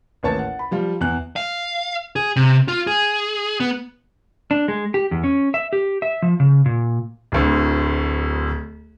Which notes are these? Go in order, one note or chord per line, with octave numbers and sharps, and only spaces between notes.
A1 D#2 C#5 A5 A6
F#5
B5
F3 G3 F4
E2 F#6
F5
G#4
C3
F4
G#4
B3
D4
G#3
G4
E2
C#4
E5
G4
E5
F3
C#3
A#2
D1 D2